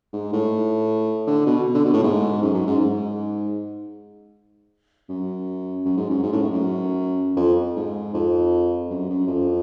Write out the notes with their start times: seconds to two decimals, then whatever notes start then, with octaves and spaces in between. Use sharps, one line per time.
0.13 G#2
0.32 A2
1.27 D3
1.46 B2
1.74 D3
1.85 B2
1.93 A2
2.03 G#2
2.42 F#2
2.54 F#2
2.67 G#2
2.80 G#2
5.09 F#2
5.85 F#2
5.97 G#2
6.10 F#2
6.23 G#2
6.32 A2
6.42 G#2
6.52 F#2
7.37 F2
7.76 G#2
8.14 F2
8.90 F#2
9.09 F#2
9.27 F2